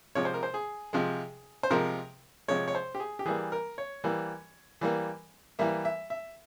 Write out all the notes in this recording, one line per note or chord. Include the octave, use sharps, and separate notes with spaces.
C3 F3 G#3 C#5
C5
A#4
C5
G#4
C3 F3 G#3
C5
C3 F3 G#3 A#4
C3 F3 G#3 C#5
C#5
C5
G4
G#4
G4
E3 G3 A#3 G#4
A#4
C#5
E3 G3 A#3
E3 G3 A#3
E3 G3 A#3 E5
E5
E5